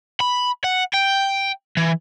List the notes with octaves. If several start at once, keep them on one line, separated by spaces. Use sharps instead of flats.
B5
F#5
G5
E3